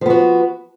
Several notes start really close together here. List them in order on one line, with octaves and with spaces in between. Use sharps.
F3 B3 F#4